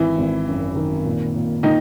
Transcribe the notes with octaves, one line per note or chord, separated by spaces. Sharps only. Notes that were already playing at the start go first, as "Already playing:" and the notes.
Already playing: G#1 E3 E4
G#1
F#2
D#3
A#2
A#2
A#2 D#3 D#4